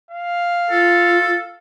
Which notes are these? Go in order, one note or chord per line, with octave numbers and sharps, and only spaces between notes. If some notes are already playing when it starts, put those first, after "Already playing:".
F5
F4 A4